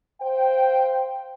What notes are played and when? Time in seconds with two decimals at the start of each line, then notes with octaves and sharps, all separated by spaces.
0.21 C5 F5 G5